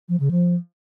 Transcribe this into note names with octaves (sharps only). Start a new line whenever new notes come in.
F3
C#3
F3